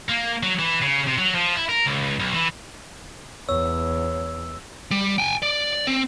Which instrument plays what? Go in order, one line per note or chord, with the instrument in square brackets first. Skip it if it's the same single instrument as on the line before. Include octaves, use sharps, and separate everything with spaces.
[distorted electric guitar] A#3
F#3
E3
C#3
C3
F#3
F3
E4
A#4
C#2
B1
E3
[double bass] E2 [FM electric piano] C#5 [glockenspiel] E6
[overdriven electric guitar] G3
G5 G#5
D5
C4